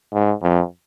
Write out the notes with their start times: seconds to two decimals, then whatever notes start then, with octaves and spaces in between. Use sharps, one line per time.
0.13 G#2
0.42 F2